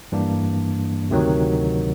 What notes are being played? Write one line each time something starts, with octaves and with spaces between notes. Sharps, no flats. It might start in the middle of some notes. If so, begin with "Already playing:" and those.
G2 E3 G3 A#3 D4
D2 C3 D#3 F#3